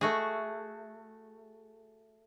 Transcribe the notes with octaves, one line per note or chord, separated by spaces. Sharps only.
A3 F#4 G#4